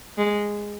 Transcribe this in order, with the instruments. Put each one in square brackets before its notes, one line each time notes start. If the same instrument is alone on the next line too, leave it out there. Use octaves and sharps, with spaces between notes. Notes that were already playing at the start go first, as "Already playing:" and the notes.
[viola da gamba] G#3